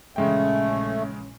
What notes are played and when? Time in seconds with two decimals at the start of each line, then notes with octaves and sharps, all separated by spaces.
0.16 A#1 C#3 E3 G#3 A3 C#4 G5